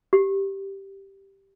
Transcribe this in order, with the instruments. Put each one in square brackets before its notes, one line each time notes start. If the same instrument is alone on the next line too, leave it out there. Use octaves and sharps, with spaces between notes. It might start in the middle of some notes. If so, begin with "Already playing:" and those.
[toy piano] G4